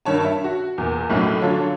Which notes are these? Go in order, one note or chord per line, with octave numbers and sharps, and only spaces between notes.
G2 D#3 C#5 A5
E5
F#4
E2 A#2
B1 A2 F#3 A3 C#4
D3 F#3 F4 A4 C#5